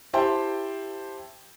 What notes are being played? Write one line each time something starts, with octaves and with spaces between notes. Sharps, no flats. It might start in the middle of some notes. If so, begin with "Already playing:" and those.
E4 G4 C5 G5 A5 C6